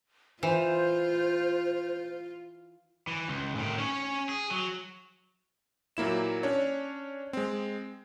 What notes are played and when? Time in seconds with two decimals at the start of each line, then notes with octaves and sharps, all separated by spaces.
0.43 E3 F4 C5
3.07 E3
3.28 C#2
3.55 A2 D#3
3.78 C#4 C#5
4.29 G#4
4.51 F#3
5.97 A#2 F#3 A#3 E4 E7
6.43 C#4 D4 C#5
7.33 G#3 C4